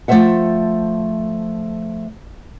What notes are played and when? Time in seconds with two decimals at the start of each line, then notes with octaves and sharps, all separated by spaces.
0.08 F3 A3 C4 C5 E5 F#5